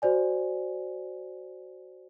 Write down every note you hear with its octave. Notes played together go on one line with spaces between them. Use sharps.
F#4 C5 D5 G#5